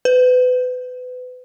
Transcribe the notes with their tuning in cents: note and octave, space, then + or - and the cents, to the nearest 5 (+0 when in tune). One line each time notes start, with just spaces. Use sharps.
B4 +30